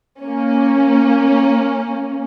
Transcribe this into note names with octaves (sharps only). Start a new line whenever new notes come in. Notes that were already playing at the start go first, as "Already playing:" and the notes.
A#3 C#4